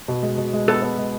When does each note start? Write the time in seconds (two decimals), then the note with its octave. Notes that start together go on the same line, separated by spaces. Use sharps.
0.08 B2
0.23 G#3
0.38 B2
0.53 G#3
0.68 B3 A4
0.82 B3
0.98 G#3